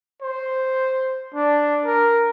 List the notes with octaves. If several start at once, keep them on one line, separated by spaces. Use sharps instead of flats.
C5
D4
A#4